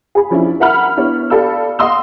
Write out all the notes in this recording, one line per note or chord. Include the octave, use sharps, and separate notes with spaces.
G#4 B5
F3 C#4 D4 E4
A#4 E5 F#5 B5 F6
B3 D4 E4 C#5
G4 A4 D5 F5 B5 E6
D#5 F5 F#5 C6 D#6 E6